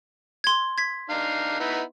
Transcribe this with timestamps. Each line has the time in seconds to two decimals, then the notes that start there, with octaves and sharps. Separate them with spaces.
0.44 C6 G#6
0.78 G#6 B6
1.10 D4 D#4 F5
1.60 B3 D#4 E4